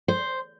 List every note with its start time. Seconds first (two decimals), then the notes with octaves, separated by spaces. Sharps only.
0.08 C5